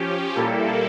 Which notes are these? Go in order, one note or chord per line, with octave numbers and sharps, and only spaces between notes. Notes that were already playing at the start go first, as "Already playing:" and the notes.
Already playing: F3 C#4 G4
A#2 G3 A#3 E4 A4